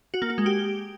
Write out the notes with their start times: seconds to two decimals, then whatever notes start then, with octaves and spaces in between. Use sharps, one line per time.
0.14 F#4
0.22 A#3
0.30 F#4
0.38 G#3
0.46 G4